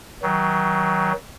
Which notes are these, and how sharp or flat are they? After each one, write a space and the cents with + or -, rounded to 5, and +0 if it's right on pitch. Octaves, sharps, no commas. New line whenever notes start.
D#3 +40 F#3 +25